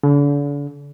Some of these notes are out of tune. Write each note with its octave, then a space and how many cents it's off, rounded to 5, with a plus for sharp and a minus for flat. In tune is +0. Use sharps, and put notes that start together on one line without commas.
D3 -40